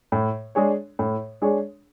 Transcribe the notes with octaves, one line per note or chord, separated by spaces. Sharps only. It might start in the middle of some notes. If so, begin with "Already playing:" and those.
A2
G#3 D4 G#4 C#5
A2
G#3 D4 G#4 C#5